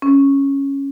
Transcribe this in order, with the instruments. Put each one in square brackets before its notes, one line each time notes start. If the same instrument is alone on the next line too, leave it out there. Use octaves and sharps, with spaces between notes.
[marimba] C#4